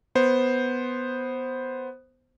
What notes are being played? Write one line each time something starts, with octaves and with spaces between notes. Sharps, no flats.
B3 C5